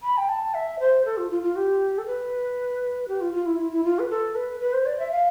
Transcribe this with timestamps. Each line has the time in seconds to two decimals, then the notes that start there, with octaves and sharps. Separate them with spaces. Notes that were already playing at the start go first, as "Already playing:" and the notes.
0.03 B5
0.18 G5
0.29 A5
0.54 E5
0.80 C5
1.05 A4
1.17 F4
1.30 F4
1.43 F4
1.56 G4
1.98 A4
2.06 B4
3.08 G4
3.21 F4
3.34 F4
3.46 E4
3.59 E4
3.73 E4
3.84 F4
3.99 B4
4.10 A4
4.35 B4
4.61 B4
4.73 C5
4.86 D5
4.99 E5
5.11 F5